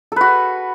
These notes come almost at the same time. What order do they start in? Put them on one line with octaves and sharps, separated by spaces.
A4 B4 F#4